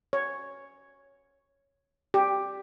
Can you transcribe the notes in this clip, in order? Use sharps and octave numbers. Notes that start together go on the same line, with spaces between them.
C#5
G4